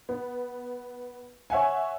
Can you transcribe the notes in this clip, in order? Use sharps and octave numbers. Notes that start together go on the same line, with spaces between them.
B3
C#5 E5 F#5 G#5